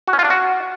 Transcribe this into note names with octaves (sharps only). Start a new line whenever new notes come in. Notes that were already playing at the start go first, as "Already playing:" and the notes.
F#4
C#4
F4
D4
F#4